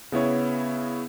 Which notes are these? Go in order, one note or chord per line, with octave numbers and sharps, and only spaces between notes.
C#3 B3 E4 C#5